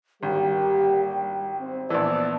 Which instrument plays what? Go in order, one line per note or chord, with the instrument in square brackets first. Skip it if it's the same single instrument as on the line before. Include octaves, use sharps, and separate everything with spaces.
[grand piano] G#1 [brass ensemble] D3 A#3 G4 [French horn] G3 [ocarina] G5
[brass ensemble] C4
[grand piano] A#1 E3 [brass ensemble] B3 A5 [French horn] D5 [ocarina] E6